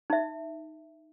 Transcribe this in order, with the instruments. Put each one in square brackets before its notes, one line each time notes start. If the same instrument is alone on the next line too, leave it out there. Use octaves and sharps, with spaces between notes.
[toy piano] D#4 E5